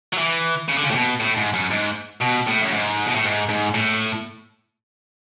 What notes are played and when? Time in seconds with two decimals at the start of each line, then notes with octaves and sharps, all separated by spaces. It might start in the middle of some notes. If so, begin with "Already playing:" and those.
0.13 F#3
0.18 E3
0.69 C#3
0.77 D3
0.84 C#3
0.91 A2
0.95 B2
1.20 A2
1.37 G#2
1.54 F#2
1.71 G#2
2.22 B2
2.47 A2
2.62 F#2
2.73 G#2
3.06 B2
3.15 A2
3.24 G#2
3.49 G#2
3.74 A2